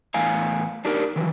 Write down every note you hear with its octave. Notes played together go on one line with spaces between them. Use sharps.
E2 A2 F5 G#5
D4 D#4 G4 A#4
D#3 E3 F#3